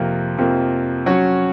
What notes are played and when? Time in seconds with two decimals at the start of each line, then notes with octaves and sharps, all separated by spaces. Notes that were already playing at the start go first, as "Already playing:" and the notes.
Already playing: F2 C3 F3 A#3
0.38 F2 C3 F3 A#3
1.06 F#3 C#4 F#4 C#5